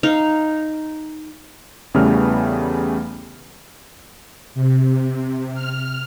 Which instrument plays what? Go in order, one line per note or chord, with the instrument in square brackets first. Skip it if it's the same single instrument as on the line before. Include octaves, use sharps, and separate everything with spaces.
[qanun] D#4 F5
[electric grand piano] E2 C#3 E3 G3 A3 F6
[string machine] C3
F6